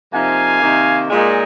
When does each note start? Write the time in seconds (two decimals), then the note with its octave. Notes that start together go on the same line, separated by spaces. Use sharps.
0.12 C3 F3 A#3 D#4 F5 G#5
0.61 C3 D#3 A#3 D#4
1.10 A#2 G#3 D#4